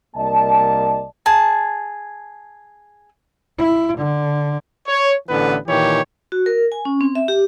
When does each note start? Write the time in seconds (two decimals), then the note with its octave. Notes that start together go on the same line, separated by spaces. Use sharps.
0.16 C2 A#3 D5 D#5 A5
1.26 G#4 A5
3.58 E4
3.98 D3
4.87 C#5
5.29 A1 D3 E3 B3 B4
5.68 A#2 D#3 E3 G4 C#5
6.32 F#4
6.46 A#4
6.72 G#5
6.85 C#4
7.01 C4
7.15 E5
7.28 G4